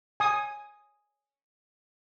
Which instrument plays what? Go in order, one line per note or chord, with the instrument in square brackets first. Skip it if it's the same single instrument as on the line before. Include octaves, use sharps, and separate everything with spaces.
[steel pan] G#5 D#6